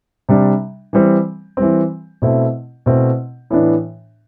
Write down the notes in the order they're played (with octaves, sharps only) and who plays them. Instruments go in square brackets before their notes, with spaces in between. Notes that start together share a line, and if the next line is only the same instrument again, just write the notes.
[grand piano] C3 G3 D4
E3 G3 C4
E3 G3 C4
B2 A3 C4 E4
B2 A3 C4 E4
A2 E3 B3 D4